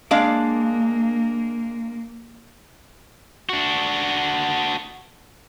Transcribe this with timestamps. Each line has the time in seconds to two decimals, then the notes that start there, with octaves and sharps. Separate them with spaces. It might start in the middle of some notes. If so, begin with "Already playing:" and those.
0.11 G#3 A#3 D4 F5
3.49 D4 F#4